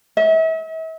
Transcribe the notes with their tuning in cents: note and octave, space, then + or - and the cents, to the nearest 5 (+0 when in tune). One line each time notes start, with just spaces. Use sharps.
E5 -40